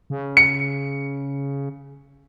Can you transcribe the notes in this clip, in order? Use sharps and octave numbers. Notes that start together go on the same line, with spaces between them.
C#3
C#7